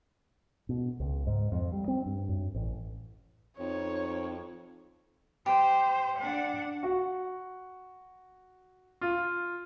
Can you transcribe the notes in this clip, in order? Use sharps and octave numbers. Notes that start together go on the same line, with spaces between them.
B2
C#2
G#2
F2
G3
C4
G2
F#2
A1
F2 D#4 C#5
G4 C5
D4 F#5
F#4
F4